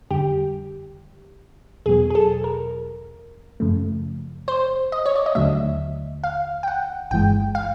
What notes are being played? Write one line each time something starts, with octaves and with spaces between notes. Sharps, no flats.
F2 D3 G3 G4
E2 B2 F#3 G#4
G#4
A4
A#4
F#2 C#3 F3 A3
C5
D#5
C#5
D5
D#5
D#2 D3 F#3 A3 E5
F5
G5
F#5
G1 G2 E3 G#3 G5
F5